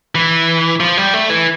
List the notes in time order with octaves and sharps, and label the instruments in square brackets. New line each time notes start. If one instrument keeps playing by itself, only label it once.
[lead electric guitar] E3
F3
G3
A3
E3